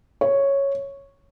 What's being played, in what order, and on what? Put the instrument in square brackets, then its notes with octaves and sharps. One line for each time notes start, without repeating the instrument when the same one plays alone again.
[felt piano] C#5